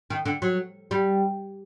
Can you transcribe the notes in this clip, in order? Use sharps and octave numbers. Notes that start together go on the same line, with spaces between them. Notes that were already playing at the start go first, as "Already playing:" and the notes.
D#3
D3
F#3
G3